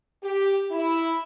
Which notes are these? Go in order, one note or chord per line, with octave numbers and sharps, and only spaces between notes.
G4
E4